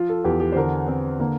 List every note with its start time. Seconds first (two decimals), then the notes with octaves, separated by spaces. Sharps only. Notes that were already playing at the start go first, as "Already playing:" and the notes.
Already playing: F3 F4
0.09 A4
0.25 E2 G4
0.40 G4
0.52 C5
0.56 D3 A#4
0.88 D3 C4
1.20 D3 A#3